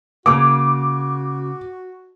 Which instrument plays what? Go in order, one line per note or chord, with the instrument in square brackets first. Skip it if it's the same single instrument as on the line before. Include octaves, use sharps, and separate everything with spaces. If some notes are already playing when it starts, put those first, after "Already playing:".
[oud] C#3 A#3 [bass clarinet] F#4 [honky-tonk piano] D6